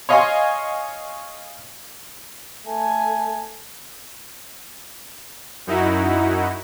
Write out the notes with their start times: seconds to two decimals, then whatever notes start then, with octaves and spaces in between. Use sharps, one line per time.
0.09 C#5 D#5 F5 G#5 C6 C#6
2.67 A3 G#5
5.67 F#2 D#4 E4 F#4